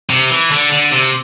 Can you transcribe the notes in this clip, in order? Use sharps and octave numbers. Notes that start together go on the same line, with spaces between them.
C3
E3
D3
D3
C3